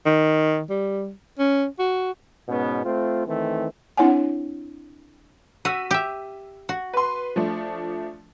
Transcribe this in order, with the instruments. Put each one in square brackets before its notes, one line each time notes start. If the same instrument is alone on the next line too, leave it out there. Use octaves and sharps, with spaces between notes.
[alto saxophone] D#3
G3
C#4
F#4
[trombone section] G#2 B2 B3 C#4
A3 C4 F4
D#3 E3 A3 C4
[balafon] C4 D4 E4 C#5 F#5 G#5
[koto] F#4 [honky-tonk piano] E6 B6 D#7
[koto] G4 E5
F#4
[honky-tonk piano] B4 C6
F3 A3 D4